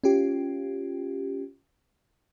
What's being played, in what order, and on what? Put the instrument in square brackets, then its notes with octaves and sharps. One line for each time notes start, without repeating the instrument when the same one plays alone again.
[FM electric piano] C#4 F4 G4